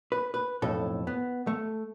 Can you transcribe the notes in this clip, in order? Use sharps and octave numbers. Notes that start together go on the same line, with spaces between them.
B4
B4
B1 F2 A2 A4
B3
A3